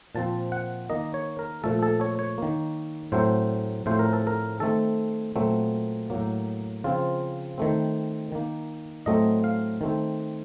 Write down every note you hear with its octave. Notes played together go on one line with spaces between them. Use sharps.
A#2 F3 C4 A5
F#5
D#3 A#3 D#5
C#5
A#4
A#2 F3 A3 A4
A4
C#5
C#5
D#3 A#3
A2 F#3 A3 C4 C5
A2 F3 A3 C4 C5
A#4
A4
A#4
D#3 A3 C4 A4
A#2 F#3 A3 C4
A2 F#3 A#3
C#3 F3 C4 F4
D#3 A3 C4
D#3 A#3
A2 F#3 A3 C4 D#5
F5
D#3 A3 C4